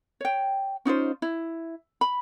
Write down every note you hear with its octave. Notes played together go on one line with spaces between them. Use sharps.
C#5 G5
C#4 D#4 F4 C5
E4
B5